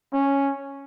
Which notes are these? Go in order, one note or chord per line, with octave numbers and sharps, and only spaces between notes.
C#4